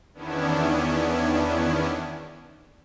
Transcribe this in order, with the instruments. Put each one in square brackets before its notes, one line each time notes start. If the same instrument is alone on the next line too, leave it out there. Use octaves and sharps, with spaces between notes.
[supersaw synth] E2 D#3 B3 C#4 D4 E4